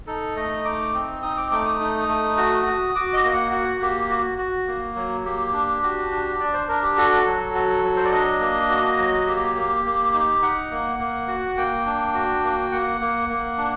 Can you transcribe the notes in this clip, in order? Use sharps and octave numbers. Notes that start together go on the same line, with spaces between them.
D#4 A4
A3 D#5
D#4 D6
C4
D#4 D#6
D6
A3 D6
D#6
D#4
A3
F#4
F#4
F#4 D6
D#5
A#3
F#5
F#4 F#5
A#3 G4
F#4
F#4
A#3
F#3
A#3 G4
D4
F#4 G4
D4
D4 D5
C5
D4 A#4
G4
F#4 A4
F#3
F#4
F#3
C5
D5
D4 D#5
A#3
F#4
F#3
A#3 G4
A#3
A#3
D#4
D#4 F#5
A#3
A#3
F#4
A#3 G5
D4
F#4
A#3
A#3 F#5
A#3
A#3
D4